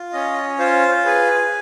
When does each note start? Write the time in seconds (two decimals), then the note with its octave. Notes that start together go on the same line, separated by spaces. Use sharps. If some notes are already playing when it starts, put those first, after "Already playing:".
Already playing: F4
0.13 C#4 D#5
0.59 F4 C5
1.05 G#4 B4